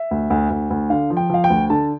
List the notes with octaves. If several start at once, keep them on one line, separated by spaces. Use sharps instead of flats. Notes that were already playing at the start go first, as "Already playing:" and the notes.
Already playing: E5
D2
D2
D2
D2
D3 F5
F3
G5
F3 F5
G5
D2
D3 A5